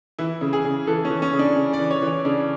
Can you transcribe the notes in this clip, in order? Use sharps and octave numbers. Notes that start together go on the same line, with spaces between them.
E3 E4
C#3
G#4
C#3
E3 A4
C#4
E3
C#4
C#3
D4
C#3
D5
E3
C#5
E3
C#5
C#3 D4